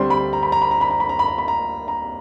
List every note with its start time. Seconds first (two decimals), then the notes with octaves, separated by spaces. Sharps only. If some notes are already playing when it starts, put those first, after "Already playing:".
Already playing: D2 D3 G3 C4 C6
0.10 B5
0.33 A#5
0.43 B5
0.52 A#5
0.62 B5
0.71 A#5
0.81 B5
0.91 A#5
1.00 B5
1.09 A#5
1.19 B5
1.28 A#5
1.38 B5
1.48 A#5
1.88 A#5